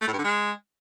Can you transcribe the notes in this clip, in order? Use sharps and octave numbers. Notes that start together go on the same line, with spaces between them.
A3
A2
G2
D3
G#3